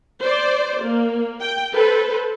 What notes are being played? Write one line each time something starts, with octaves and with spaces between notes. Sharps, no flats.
C5 D5
A#3
G5
A4 B4 C5